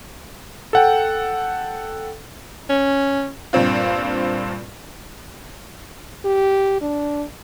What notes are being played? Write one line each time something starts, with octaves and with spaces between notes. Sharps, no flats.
A4 F#5 G5
C#4
G2 A#2 C4 F4
G4
D4